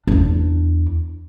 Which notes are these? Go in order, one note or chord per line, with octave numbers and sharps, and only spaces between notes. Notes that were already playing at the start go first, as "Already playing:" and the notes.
E2 D4